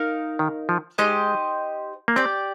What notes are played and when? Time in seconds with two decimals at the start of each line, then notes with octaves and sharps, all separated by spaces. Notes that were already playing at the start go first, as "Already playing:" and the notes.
Already playing: D#4 A#4 F5
0.39 D#3
0.69 F3
0.98 G#3 D#4 G4 C5 D#5
2.08 A#3
2.16 C4 G4 D5 G5